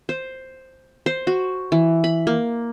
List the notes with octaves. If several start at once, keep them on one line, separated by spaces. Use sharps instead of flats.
C5
C5
F#4
E3
B5
A#3